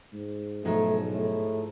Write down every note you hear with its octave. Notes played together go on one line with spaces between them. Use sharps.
G#2
B1 G#2 F3 G#3 A3
A2